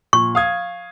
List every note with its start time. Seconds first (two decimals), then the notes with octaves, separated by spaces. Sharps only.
0.13 A#2 C#6
0.35 F5 D#6 G#6